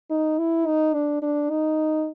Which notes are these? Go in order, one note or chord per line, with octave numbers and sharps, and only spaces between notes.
D#4
E4
D#4
D4
D4
D#4